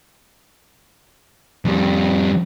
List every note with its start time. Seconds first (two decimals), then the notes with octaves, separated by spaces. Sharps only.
1.65 F2 G3